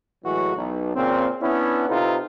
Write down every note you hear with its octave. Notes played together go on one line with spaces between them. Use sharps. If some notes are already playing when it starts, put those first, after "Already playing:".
A2 E3 F#3 G#3 F#4
B1
A#2 C#3 C4
B3 C#4 D4 E4
C3 D#4 F4 A4 B4